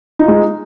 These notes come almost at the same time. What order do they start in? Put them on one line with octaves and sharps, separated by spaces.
D#4 F4 G#3